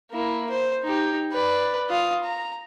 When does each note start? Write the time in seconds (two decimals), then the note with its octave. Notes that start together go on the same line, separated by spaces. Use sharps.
0.11 A#3 E4
0.50 C5
0.83 D#4 G4
1.33 B4 D5
1.90 F4 D#6
2.23 A#5